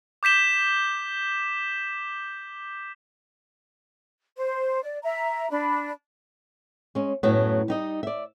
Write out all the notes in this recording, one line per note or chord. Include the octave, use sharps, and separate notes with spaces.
D6 G6 B6 E7 G7
C5
D5
E5 A#5
D4 B5
G#3 C#4
F#2 A2 F#3 A3 B3
G3 D#4 D#5
D5 E5